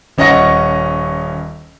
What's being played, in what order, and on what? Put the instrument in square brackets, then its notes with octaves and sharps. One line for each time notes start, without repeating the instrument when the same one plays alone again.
[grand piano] D#1 C#4 D#5 F#5 C#6 A#6